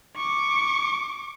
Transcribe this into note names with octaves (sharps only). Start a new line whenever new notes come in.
C#6 D6